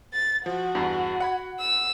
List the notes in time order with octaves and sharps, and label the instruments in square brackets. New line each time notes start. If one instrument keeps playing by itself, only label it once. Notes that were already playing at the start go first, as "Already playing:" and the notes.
[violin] A6
[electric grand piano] F3 [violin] F#4
[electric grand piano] E2 G2
F#5 B5 G#6
[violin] E6